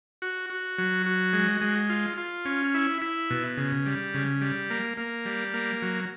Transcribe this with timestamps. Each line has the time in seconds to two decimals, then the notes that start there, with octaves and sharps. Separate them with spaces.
0.22 F#4
0.50 F#4
0.78 F#3
1.06 F#4
1.33 G#3
1.61 G#3
1.89 F4
2.17 F4
2.45 C#4
2.74 E4
3.02 E4
3.30 B2
3.57 C#3
3.86 G3
4.14 C#3
4.41 G3
4.70 A#3
4.98 A#3
5.25 G3
5.54 A#3
5.82 F#3